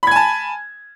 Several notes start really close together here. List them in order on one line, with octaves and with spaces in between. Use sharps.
B5 G#6 G#5 A5